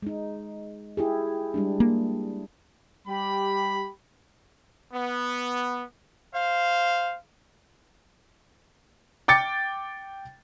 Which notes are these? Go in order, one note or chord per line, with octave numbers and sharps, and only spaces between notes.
G#3 D#4
E4 G4 G#4
G3 G#3 D4
A#3
G3 G4 B5
B3
C5 F5
G5 D6 A6 C#7